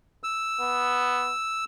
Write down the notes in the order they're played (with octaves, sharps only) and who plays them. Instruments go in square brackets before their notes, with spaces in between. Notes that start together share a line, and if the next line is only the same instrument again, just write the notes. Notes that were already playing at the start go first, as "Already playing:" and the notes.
[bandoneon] E6
[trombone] B3